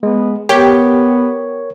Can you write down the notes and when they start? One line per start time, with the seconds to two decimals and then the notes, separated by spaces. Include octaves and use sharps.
0.03 G#3 B3
0.49 B3 G4 A#4 C#5